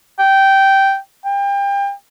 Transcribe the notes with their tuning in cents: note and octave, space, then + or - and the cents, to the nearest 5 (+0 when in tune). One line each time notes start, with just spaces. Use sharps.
G5 -10
G5 +30